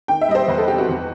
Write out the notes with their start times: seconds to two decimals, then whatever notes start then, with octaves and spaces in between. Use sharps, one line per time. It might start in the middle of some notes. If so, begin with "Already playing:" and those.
0.08 D#3 G5
0.21 E5
0.28 G3 D#5
0.35 C5
0.48 E2 B4
0.58 A4
0.68 C3 G4
0.78 F#4
0.89 E2